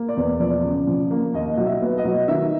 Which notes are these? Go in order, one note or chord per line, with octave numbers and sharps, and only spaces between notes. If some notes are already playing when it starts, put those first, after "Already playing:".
Already playing: A#3
D5
E2
F3 D5
C#3
F3
A#3
D#2 D#5
F#3 D#5
E5
B3
D#5
F#3
D#3 E5